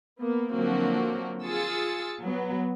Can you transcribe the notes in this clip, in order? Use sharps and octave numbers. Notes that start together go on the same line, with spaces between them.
A#3 B3
D3 F3 F#3 A#3 C4 F#4
F4 G#4 E6 A6 C#7
F#3 B3